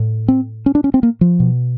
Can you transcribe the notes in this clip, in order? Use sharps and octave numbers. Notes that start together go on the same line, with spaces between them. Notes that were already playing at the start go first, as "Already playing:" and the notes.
Already playing: A2
C4
C#4
D4
C#4
C4
A#3
F3
B2